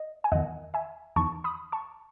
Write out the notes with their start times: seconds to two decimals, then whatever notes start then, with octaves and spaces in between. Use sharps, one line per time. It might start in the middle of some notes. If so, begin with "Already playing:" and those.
Already playing: D#5
0.24 G#5
0.32 E2 D#3 D#5 F#5
0.74 E5 G#5
1.16 E2 D#3 A5 C#6
1.44 B5 D#6
1.72 A5 C#6